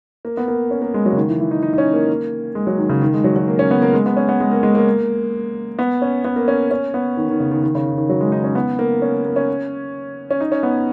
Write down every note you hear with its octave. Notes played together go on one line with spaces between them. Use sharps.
A#3
B3
A#3
C#4
A#3
G#3
F#3
C#3
D#3
E3
E3
D#4
D#4
D#4
C#4
A#3
G#3
F#3
D#3
C#3
D#3
G#3
F#3
F#3
A#3
C#4
B3
A#3
G#3
B3
C#4
B3
G#3
A#3
G#3
A#3
B3
C#4
B3
A#3
C#4
C#4
B3
D#3
D#3
C#3
D#3
D#3
C#3
D#3
D#3
F#3
G#3
D#4
C#4
B3
A#3
C#4
A#3
C#4
C#4
D#4
C#4
B3